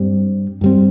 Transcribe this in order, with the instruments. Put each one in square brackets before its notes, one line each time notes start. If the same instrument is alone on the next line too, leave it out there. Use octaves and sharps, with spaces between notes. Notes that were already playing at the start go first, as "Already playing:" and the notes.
Already playing: [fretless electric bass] G2 G3 C4
G2 G3 C4